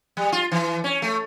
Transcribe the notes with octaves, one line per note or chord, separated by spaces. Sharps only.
G3
F4
E3
C#4
A3